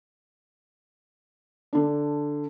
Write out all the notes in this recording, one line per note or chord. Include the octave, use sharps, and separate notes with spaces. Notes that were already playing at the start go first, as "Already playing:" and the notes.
D3 D4